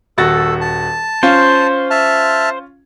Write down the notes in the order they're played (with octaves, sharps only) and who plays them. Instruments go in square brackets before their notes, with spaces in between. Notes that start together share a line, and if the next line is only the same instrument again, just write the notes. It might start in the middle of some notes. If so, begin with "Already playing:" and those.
[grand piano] D#1 F#4 A6 [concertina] A4
[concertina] A5
[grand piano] C#4 F4 [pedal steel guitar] C5
[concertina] E5 A5 F6